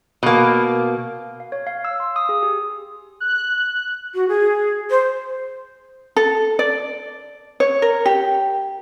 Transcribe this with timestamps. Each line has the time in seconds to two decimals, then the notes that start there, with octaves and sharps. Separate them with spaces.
0.23 B2 A#3
1.40 F5
1.52 C#5
1.67 F5
1.85 E6
2.00 C6
2.16 D#6
2.29 G#4
2.43 G4
3.20 F#6
4.15 F#4
4.29 G#4
4.90 C5
6.17 A4
6.59 D5
7.60 C#5
7.82 A#4
8.06 G4